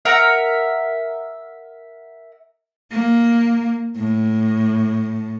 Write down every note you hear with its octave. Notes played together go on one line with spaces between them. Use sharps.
A#4 E5 F#5 A#5
A#3
A2